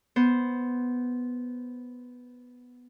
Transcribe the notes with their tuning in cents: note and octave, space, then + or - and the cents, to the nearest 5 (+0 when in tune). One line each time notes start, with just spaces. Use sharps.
B3 +0 C5 +0